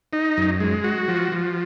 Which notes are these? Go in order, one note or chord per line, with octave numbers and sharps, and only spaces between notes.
D#4
F#2
G#3
F#4
F3
F3